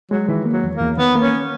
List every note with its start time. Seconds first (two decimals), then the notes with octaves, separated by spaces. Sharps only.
0.11 F#3 G#3
0.28 D#3 E3
0.45 A#3
0.52 F#3
0.64 E2
0.75 A#3
0.80 E2
0.98 D#3 B3
1.15 A#3
1.22 C#4